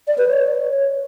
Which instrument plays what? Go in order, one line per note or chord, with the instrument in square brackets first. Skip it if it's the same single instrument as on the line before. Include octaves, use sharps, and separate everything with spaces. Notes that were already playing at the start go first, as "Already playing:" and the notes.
[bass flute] D5
B4
C#5